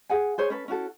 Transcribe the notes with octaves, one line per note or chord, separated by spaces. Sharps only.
G#4 F#5 G#5
G#4 C5 C#5
C#4 A4 B4
C#4 E4 F#4 A4